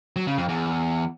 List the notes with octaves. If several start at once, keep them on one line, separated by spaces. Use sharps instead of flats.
F#3
C#3
F2
E2